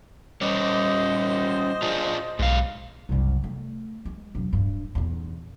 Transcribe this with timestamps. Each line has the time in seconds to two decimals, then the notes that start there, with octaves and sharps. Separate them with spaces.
0.41 G3 C#4 C5 C#5 D#5 D6
1.82 D4 F4 G#4
2.39 B1 G#2 F5
3.09 F#1 C2
3.44 A3
4.05 G#3
4.35 E1 F#3
4.53 D1 G2
4.95 D#1 E2